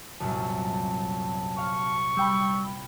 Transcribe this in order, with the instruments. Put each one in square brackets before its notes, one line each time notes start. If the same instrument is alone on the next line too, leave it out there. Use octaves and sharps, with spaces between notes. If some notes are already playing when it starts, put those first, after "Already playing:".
[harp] C2 F#2 A#2 [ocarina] A5
[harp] F5 [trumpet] C#6
[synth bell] G3 G5 B5 [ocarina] E6